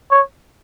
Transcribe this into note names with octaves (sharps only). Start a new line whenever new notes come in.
C#5